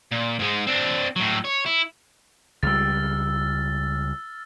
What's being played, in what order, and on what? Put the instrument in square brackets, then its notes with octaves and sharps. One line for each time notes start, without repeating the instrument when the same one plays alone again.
[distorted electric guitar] A#2
G#2 G#3
C4 D4
A2 F#3
C#5
E4
[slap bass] C#2 G3 [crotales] E6 F6 A6